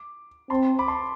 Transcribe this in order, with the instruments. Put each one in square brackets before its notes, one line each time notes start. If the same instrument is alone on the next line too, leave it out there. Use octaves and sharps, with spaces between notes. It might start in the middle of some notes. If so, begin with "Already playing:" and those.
Already playing: [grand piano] D6
[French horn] C4 [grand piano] A5 C6
[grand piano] B5 D6
A5 C6